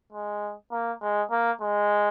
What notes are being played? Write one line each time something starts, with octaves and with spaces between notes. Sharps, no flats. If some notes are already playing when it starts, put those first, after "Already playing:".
G#3
A#3
G#3
A#3
G#3